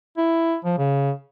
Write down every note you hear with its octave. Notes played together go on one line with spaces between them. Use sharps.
E4
F3
C#3